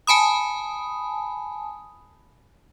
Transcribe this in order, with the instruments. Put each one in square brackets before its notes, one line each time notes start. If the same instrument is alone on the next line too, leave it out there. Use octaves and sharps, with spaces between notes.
[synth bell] G#5 A5 B5 D#6